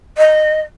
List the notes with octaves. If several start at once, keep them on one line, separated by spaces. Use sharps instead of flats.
D#5